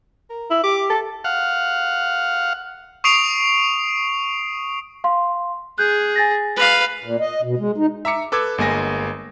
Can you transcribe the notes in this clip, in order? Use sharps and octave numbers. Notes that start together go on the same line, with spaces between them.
A#4
E4
G4 D6
A4
F5 F#5
C#6 D#6 C7 D7 F7
F5 C6
G#4 F#6 G6
G#5 A6 A#6
B4 F5
A#2
D#5
B2
G#3
D#4
E5 A#5 D6 C#7
A4 B4 D6 E6 G#6
G1 G#3 A#3 G#5 A#6